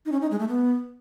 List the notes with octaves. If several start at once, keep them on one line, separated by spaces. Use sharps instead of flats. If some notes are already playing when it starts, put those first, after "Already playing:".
D#4
C#4
D#4
G#3
A3
B3